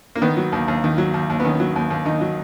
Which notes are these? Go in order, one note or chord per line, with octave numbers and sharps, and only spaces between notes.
A#3
D#3 B3
F#3
D#2
D#2
D#3
F#3
D#2
D#2
B3
D#3 C#4
F#3
D#2
D#2
D#3 D#4
F#3